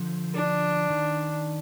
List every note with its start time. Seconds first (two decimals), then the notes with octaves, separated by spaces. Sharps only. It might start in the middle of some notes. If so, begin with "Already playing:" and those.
Already playing: D3 F3
0.35 D4
0.90 D#3